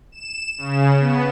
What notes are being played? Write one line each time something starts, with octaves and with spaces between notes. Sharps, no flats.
E7
C#3
B3